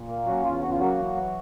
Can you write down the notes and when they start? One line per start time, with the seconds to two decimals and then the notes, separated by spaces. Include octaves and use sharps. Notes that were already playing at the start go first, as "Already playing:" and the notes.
Already playing: A#2
0.08 A#3
0.26 F#3 C#4 F#4
0.44 E2 F4
0.62 C#3 F#4
0.71 F4
0.80 F#3 A#3 F#4
0.98 E3
1.16 E3